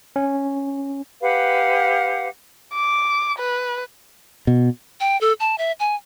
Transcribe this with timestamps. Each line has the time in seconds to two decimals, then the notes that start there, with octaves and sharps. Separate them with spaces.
0.16 C#4
1.21 G4 B4 F5 F#5
2.73 D6
3.39 B4
4.47 B2
5.00 G5
5.21 A4
5.40 A5
5.58 E5
5.80 G#5